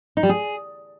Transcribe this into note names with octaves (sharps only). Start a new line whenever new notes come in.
D#4
G3
G#4